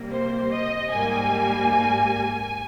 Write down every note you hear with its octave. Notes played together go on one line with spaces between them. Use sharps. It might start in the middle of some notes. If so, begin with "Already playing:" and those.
Already playing: C3 G3 A#3
C5
D#5
G#2 G3 A#3 G#5